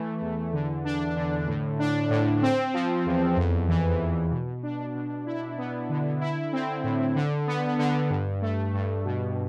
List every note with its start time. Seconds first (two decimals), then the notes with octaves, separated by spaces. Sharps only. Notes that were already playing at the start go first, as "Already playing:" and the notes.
Already playing: E3 A3
0.21 E2
0.53 D3
0.85 D4
1.16 D3
1.47 A2
1.79 D4
2.10 A2
2.42 C4
2.74 F3
3.06 E2
3.37 F2
3.68 E3
4.00 F2
4.32 B2
4.63 D4
4.95 B2
5.26 E4
5.58 B3
5.89 D3
6.21 E4
6.53 C4
6.84 A2
7.16 D3
7.47 B3
7.79 D3
8.10 G2
8.42 A3
8.73 G2
9.05 B2